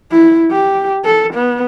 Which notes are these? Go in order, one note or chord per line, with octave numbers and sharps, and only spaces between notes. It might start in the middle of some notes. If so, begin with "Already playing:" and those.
E4
G4
A4
B3